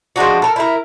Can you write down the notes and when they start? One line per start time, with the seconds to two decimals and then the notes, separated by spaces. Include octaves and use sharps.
0.16 F3 G#3 D4 F#4
0.42 A4 A#4
0.56 E4 A#4